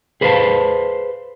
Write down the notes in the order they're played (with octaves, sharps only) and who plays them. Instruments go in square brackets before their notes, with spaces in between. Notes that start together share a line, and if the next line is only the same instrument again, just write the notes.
[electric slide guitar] G#4 B4 C5 D#5 F5 A5